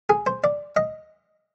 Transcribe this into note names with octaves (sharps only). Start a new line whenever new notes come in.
G#4
C5
D5
D#5